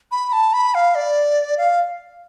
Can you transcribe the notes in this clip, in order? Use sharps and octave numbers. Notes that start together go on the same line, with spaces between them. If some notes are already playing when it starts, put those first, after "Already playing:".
B5
A5
B5
F5
D5
F5